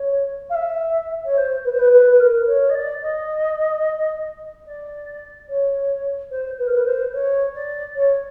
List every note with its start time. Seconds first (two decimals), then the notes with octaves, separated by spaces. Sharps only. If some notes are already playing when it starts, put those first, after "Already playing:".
Already playing: C#5
0.49 F5
0.54 E5
1.25 C#5
1.37 C5
1.64 B4
1.71 C5
1.78 B4
1.92 B4
2.11 B4
2.19 A#4
2.46 C#5
2.69 D#5
2.74 D5
3.01 D#5
4.66 D5
5.48 C#5
6.30 C5
6.58 B4
6.66 A#4
6.75 B4
6.85 C5
7.13 C#5
7.54 D5
7.95 C#5